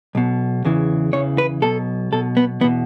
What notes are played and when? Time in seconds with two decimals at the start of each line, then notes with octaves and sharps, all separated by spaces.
0.15 B1 B2
0.65 E2 C#3 E3
1.13 E2 C#3 E3 C#5
1.38 B4
1.62 B1 B2 A4
2.12 B1 B2 A4
2.37 B3
2.61 E2 B3
2.64 B2